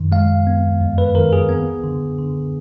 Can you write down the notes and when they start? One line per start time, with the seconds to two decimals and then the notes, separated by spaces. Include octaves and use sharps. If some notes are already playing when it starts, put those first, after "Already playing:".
Already playing: F#2 D#3
0.12 G#3 F5
0.47 B3
0.81 F2
0.98 B4
1.15 D#3 A#4
1.33 G#4
1.49 B3
1.84 D3
2.18 D3